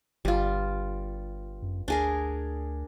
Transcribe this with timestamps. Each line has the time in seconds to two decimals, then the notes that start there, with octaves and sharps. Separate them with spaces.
0.25 G1 G3 F4
1.62 F#2
1.88 D2 D4 G#4 A#4